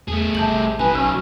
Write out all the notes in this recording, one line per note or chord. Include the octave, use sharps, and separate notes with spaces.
E2 A3 G#4
A1 C3 A5 G6 F#7
F#3 D#4 B4 G#5
A#1 C#4 E6